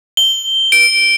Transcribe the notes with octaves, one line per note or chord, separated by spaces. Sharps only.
G7
D7